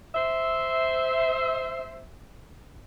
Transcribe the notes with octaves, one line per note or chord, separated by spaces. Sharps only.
C5 E5